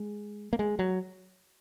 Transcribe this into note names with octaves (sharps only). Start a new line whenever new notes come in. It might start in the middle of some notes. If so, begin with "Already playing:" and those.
Already playing: G#3
A#3
G#3
F#3